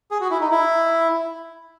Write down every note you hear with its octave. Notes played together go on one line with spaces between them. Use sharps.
G#4
F#4
E4
D#4
E4